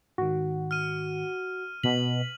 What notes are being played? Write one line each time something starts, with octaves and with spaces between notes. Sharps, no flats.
G#2 D#3 F#4
F6 D#7
B2 B6 F#7